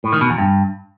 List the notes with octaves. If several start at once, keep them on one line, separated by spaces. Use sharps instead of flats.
A2
D#3
B2
E2
G2